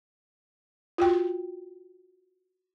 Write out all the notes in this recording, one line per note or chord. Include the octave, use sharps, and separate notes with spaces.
F4 F#4 G5